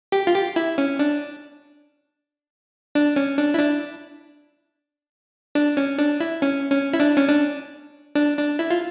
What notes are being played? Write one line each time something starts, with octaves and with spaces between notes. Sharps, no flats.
G4
F4
G4
E4
C#4
D4
D4
C#4
D4
E4
D4
D4
C#4
D4
E4
C#4
C#4
E4
D4
C#4
D4
D4
D4
E4
F4